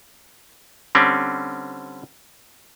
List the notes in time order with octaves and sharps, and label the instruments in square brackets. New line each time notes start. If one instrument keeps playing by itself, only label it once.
[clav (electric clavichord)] D3 G3 C4 C#4